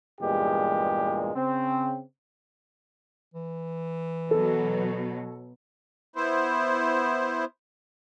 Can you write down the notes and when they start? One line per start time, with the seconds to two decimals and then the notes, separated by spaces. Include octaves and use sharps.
0.21 E2 G2 A#2 G#3 G4
1.35 C#3 C4
3.34 E3
4.31 B2 F#3 A4
6.16 B3 E4 C5